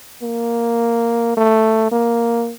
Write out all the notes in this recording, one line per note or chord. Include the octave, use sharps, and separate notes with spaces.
A#3
A3
A#3